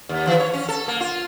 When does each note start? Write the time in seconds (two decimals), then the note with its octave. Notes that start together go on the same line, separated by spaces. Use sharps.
0.09 D#2
0.27 E3
0.40 C#5
0.53 C#4
0.69 A4
0.88 A#3
1.01 F4